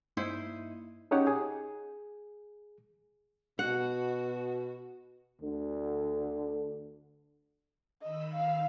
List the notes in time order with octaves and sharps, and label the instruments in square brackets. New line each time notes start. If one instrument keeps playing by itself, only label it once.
[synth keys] G2 A#3 D#7 [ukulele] D#4 E4 C5
[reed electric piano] C#4 D#4 G4 G#4 C#5 F#5
G#4
[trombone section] B2 [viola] F#4 [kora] F#5
[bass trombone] D2 [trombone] D3
[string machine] D#3 B5 E6 [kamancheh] D#5
[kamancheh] F5